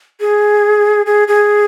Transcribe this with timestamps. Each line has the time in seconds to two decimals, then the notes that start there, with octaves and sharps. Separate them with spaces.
0.21 G#4
1.06 G#4
1.28 G#4